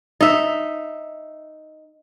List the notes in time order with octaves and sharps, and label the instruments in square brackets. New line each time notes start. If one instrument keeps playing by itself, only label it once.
[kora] D#4 E5